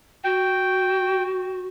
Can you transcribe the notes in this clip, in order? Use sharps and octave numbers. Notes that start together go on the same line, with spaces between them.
F#4 G5